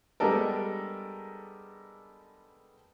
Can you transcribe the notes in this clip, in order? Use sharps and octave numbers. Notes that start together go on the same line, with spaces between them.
G3 G#3 B3 D4 A4 A#4